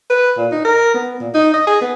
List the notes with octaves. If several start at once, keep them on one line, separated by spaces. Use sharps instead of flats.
B4
A#2
D#4
A#4
B3
A#2
D#4
D#5
G#4
B3